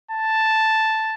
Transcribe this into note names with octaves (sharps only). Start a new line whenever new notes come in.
A5